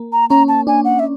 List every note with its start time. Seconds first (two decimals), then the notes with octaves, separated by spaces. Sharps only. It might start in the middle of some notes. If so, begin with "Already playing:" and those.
Already playing: A#3
0.12 A#5
0.30 C#4 A#5
0.48 A5
0.67 D4 G#5
0.85 F#5
0.99 E5